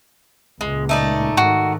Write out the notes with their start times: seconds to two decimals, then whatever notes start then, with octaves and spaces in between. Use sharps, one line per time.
0.61 C#2 A#2 G#3
0.89 A3 D#4 D5
1.37 G#2 D#3 F#4